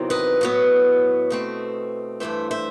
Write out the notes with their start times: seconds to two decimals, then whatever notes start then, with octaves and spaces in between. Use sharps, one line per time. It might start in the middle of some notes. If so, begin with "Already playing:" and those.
Already playing: E2 C3 D#3 F#3 C4
0.10 B4 D#5
0.41 A2 F#3 B3
1.30 B2 A3 C4
2.20 G2 E3 A3 C5 E5
2.51 C5 E5